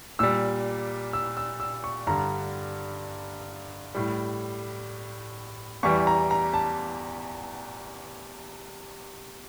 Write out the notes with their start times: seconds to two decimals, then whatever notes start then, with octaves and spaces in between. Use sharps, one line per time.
0.19 A#2 G3 E6
1.13 E6
1.37 E6
1.60 E6
1.84 C#6
2.07 G2 D3 G3 A#5
3.95 A2 G3
5.83 E2 E3 G3 C#6
6.07 A#5
6.31 A#5
6.54 A5